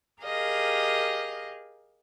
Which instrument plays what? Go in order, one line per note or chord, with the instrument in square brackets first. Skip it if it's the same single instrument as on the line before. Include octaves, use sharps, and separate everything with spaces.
[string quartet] G4 G#4 A#4 D#5 F5